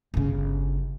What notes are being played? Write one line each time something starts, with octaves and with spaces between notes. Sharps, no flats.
G1 C#3